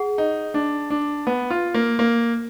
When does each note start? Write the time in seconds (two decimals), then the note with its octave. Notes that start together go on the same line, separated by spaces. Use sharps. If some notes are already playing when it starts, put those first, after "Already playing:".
Already playing: G#4 F#5
0.18 D#4
0.54 D4
0.90 D4
1.27 B3
1.50 F4
1.74 A#3
1.99 A#3